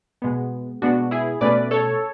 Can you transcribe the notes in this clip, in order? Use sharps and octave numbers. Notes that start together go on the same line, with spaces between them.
B2 G#3 B3
B2 G#3 B3 D4 F#4
E4 G#4
B2 A3 C#4 B4 D5
A4 C#5